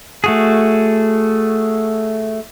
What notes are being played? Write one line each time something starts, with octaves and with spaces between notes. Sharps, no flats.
A3 F#4 G#4